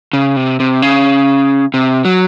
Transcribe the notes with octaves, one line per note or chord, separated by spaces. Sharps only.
C#3
C3
C3
C#3
C3
F#3